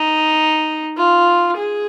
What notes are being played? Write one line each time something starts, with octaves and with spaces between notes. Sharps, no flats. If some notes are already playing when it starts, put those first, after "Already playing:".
Already playing: D#4
F4
G#4